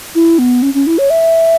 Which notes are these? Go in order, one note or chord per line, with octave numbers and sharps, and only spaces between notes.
E4
B3
C#4
C#4
E4
C#5
E5